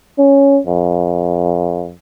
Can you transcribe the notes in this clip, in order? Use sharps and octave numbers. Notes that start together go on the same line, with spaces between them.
C#4
F2